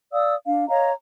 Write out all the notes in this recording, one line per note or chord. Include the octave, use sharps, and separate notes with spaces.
D5 F5 D#6 E6
D4 F5
C#5 D#5 F5 A#5